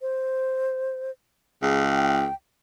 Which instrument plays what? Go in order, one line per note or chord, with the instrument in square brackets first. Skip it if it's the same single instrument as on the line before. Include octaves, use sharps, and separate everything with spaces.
[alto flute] C5
[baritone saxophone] C#2 [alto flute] G#4
[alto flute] G5